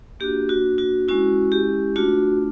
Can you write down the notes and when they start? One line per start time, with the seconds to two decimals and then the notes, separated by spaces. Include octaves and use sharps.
0.20 A#3 D4 F#4 G4
0.49 F#4
0.78 F#4
1.08 G#3 C#4 E4 F#4
1.52 G4
1.96 A3 D4 F4 F#4